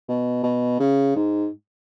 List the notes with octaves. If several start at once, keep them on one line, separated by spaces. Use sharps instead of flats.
B2
B2
C#3
G#2